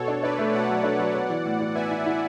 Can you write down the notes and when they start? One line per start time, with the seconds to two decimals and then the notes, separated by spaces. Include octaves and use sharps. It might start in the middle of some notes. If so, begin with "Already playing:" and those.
Already playing: B2 A4 C#5
0.08 D4
0.23 D4 B4 D5
0.38 A3
0.53 B2 D5 F#5
0.69 F#3
0.84 D4
0.99 F#3
1.15 B3
1.30 E3
1.45 A2
1.60 E3
1.75 B3 E5 G#5
1.91 E4
2.06 E4